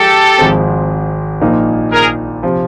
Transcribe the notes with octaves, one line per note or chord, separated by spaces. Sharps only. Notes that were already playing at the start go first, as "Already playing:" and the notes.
Already playing: F3 G#3 G4 A4
G#1 G#2 F3 G#3 C4
A#1 A#2 F3 A#3 D#4
G#4 A#4
C3 F3